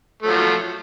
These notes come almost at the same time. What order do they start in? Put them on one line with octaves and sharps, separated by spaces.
A3 F#3 F3